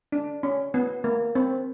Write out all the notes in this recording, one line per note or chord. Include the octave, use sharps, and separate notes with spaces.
D4
C#4
B3
A#3
C4